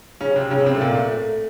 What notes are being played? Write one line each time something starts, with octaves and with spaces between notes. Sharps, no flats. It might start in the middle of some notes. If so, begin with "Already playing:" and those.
C#3 C#4
C3 C4
C#3 C#4
C3 C4
A3
A#2 A#3
A3